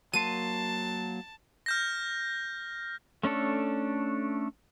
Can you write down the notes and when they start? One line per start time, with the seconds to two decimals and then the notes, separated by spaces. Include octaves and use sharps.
0.14 F#3 A#3 A5 C6 D#7
1.66 F6 G6 A#6
3.23 A3 C#4 D4 A4